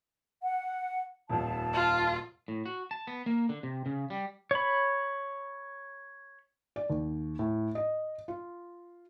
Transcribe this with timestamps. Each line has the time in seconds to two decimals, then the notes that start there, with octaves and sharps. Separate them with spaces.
0.42 F#5
1.29 D#1 F2 A5
1.73 F4
2.48 A2
2.66 F#4
2.91 A5
3.07 B3
3.26 A#3
3.49 D3
3.63 C3
3.86 C#3
4.10 G3
4.51 C#5 B5
6.76 D5
6.90 D#2
7.39 A2
7.75 D#5
8.28 F4